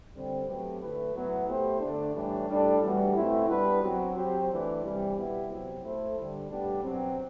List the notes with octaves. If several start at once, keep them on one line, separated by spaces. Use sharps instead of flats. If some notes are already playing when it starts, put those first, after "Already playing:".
D3 G3 C4
F#3 A3 C4 G4 B4
D3 A3 E4 B4
A2 F#3 B3 E4
A3 E4 G4 C5
D3 A3 D4
A2 E3 G3 D4
A2 G3 D4 A4
A2 E3 G3 B3 F#4
B2 A3 C4 E4
G3 B3 D4 F#4 B4
F#3 C4 F#4
F#3 C4 G4 C5
E3 A3 D4
C3 E3 G3
B2 G3 B3 E4 G4
C3 F#3 C4
A3 E4 A4 C5
D3 G3 D4
A2 G3 B3 D4 G4
B2 F#3 C4